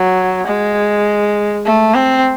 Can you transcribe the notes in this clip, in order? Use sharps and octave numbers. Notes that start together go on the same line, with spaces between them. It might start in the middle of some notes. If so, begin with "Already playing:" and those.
Already playing: F#3
G#3
A3
C4